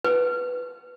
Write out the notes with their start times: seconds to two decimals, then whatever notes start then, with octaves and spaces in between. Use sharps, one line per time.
0.04 B4